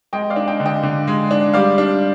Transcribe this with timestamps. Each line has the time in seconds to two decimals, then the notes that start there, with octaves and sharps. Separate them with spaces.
0.13 G#3 D#5 G5
0.30 D5 F5
0.36 D4
0.48 D#5 G5
0.60 D3
0.66 D#5 G5
0.83 D3
1.07 G#3
1.31 D4
1.53 G3 D5 F5
1.78 D4